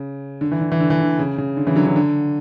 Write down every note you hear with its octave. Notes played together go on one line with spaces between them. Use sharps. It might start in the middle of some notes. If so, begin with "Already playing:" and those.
Already playing: C#3
D3
E3
D3
E3
D3
E3
D3
C#3
C#3
D3
C#3 E3
D3 F#3
D3 F#3
D3